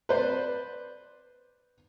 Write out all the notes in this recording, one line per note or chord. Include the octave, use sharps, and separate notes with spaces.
B4 C5 D5